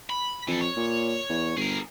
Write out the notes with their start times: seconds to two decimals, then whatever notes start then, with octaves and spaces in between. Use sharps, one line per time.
0.10 B5
0.48 F2 E3 A4
0.61 C#5
0.76 A#2
1.29 E2
1.57 G1 G#4 A#4